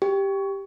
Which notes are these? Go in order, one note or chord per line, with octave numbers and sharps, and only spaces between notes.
G4